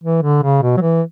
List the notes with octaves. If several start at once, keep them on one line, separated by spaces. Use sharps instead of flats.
E3
D3
C#3
B2
F#3
E3